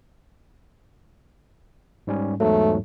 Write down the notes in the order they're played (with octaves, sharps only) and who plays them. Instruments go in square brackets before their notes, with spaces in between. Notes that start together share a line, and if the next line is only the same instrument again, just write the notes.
[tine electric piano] G#2 G3 C#4
[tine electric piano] E2 G#2 F#3 [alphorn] A3